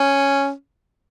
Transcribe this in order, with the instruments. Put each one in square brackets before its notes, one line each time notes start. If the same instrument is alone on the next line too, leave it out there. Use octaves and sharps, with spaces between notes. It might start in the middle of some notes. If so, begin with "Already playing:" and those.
Already playing: [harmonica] C#4